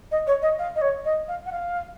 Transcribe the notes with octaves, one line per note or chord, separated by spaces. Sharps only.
D#5
C#5
D#5
F5
D#5
C#5
D#5
F5
F#5
F5